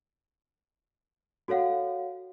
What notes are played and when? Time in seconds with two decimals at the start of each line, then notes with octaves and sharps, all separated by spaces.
1.48 F#4 A4 C#5 F5 F#5